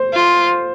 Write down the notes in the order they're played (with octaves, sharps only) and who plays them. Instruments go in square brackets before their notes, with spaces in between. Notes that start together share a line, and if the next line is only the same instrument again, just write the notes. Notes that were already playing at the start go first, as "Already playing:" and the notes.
Already playing: [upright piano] C5
[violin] F4